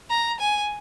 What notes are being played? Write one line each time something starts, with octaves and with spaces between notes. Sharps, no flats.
A#5
G#5